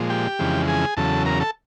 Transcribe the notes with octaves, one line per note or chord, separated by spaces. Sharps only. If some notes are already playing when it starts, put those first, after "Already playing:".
Already playing: A#2 F3 G#3
G4 G5
F2 C#3 E3 G#3
G#4 G#5
E2 C#3 F#3 A4 A5
A#4 A#5
A4 A5